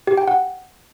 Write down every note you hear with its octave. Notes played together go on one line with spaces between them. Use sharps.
G4
G5
F#5